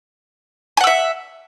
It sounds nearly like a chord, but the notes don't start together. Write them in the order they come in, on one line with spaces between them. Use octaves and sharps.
G#5 F#5 E6 E5